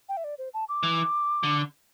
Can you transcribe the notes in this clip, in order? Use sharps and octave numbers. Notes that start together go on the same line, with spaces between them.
G5
E5
D5
C5
A5
D6
E3
D3